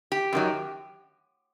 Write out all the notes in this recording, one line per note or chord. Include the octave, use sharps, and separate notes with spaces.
G4
F#2 D#3 F#3